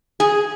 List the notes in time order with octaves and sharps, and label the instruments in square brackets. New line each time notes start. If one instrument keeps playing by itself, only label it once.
[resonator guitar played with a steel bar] G#4